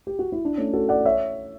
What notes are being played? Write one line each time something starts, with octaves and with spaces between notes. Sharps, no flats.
G4
F#4
E4
D4
A3 C#4
F#4 A4
D5 F#5
C#5 E5